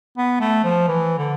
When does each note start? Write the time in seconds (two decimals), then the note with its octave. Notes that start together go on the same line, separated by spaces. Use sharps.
0.18 B3
0.40 A3
0.64 F3
0.88 E3
1.18 D3